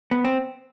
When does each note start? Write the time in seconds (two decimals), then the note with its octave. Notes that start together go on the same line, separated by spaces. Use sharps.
0.11 B3
0.25 C4